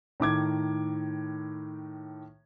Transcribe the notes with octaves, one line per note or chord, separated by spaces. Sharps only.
A2 D#3 D6 G#6